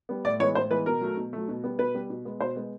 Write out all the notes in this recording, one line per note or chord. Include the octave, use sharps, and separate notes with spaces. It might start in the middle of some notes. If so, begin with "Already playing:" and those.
G3 B3
A2 D5
E3 G#3 B3 C#5
A2 C5
E3 G#3 B3 B4
B2 A#4
F#3 A3
B2
F#3 A3
B2
G3 B3
B2 B4
G3 B3
B2
G#3 B3
B2 C5
G#3 B3